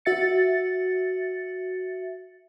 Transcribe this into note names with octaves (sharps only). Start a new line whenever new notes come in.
F#4 E5 A6 C#7